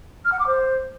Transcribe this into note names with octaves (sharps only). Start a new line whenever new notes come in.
F6
F#5
D6
C5